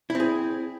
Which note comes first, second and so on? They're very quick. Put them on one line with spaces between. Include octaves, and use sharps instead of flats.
E4 C4 G#4